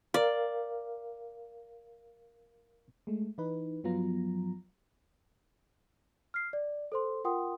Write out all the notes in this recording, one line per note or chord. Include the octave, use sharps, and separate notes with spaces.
A#4 D5 F5
G#3 A3
E3 D#4 B4
G2 F3 F#3 B3 F4 A#5
F6 C7
D5
A4 C5 C6
F4 A#4 F#5 G5 C6 D#6